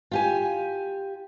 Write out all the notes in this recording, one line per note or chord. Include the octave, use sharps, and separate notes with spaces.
F4 G4 G#5